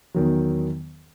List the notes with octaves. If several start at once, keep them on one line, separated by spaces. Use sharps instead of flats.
E2 D#3 F#3